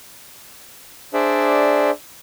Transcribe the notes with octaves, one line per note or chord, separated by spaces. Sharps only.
D4 G#4 C5 D5 E5